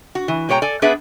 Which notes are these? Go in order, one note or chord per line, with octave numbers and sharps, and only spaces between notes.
F#4
E3
B2 G#3 C#5 G5 A#5
A4 D5 G#5
B3 D4 G#4 B4 E5 F#5